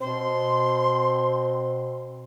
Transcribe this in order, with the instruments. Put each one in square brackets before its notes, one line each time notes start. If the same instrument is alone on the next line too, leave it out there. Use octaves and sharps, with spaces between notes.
[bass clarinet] B2 [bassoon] C4 [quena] C6